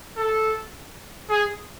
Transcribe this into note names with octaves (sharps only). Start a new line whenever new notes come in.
A4
G#4